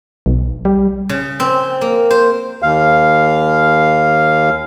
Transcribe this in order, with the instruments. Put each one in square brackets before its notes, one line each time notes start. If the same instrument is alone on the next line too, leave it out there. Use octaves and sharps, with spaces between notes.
[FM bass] B1
G3
[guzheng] C#3
C4
A#3
C5
[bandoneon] D#2 F5